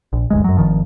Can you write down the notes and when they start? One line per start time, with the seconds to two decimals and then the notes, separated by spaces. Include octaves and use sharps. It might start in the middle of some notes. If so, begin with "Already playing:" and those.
0.13 A#1
0.30 G1 D2 G#3
0.44 F#2 F#3
0.57 G#1 D#3 F3